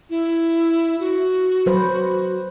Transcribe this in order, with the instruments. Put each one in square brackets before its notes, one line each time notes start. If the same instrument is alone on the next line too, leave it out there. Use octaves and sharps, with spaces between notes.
[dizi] E4
F#4
[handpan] F#3 B4 C5